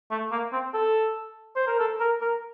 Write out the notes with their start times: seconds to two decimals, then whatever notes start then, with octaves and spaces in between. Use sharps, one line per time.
0.11 A3
0.31 A#3
0.52 C4
0.74 A4
1.56 C5
1.67 A#4
1.79 A4
2.00 A#4
2.21 A#4